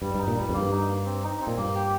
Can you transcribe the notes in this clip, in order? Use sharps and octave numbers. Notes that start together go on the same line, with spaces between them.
G2 G3
G2
D#4
A#2
G2 G3
F2
G2 A#3
D#4
A#3
C4
D#4
C4
A#2
G2 A#3
G4